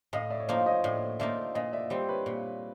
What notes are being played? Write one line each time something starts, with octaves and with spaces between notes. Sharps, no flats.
A2 D#5 F5
D5 E5
C#5
F3 A#3 D#4 C5 D5
C#5 D#5
A2 D5 E5
F3 A#3 D#4 D5 E5
A#2 D#5 F5
D5 E5
G3 C4 C5 D5
B4 C#5
A#2